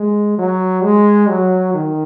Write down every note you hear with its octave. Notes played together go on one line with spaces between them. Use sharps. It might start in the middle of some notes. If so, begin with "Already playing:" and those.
Already playing: G#3
F#3
G#3
F#3
D#3